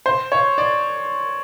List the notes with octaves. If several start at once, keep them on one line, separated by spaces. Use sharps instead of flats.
C5
C#5
D5